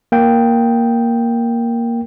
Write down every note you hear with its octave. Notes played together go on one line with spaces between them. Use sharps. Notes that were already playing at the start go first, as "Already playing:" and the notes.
A#3 G5